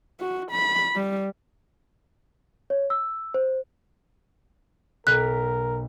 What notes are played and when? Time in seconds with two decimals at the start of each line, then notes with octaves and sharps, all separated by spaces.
0.20 F#4
0.51 B5
0.95 G3
2.70 C#5
2.90 E6
3.34 C5
5.07 B1 A#4 F#6 B6